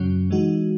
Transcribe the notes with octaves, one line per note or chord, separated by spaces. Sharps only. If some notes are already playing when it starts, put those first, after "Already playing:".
Already playing: F#2 C#3 F#3 C#4
E3 G#3 D#4 F#4